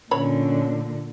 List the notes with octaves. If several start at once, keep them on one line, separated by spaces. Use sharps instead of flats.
A#2 D3 C#4 C#5 B5